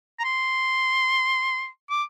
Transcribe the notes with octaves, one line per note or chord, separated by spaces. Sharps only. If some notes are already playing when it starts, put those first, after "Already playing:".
A#5
C6
D6